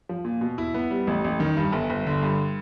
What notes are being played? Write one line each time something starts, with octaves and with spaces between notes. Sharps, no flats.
F3
A#2
B2
E4
B3
G3
A1
A1
D#3
G2
G1
G1
D3
G2